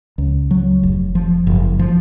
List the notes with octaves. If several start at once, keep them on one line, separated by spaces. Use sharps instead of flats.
C#2
F#3
F1
F3
F#1
F3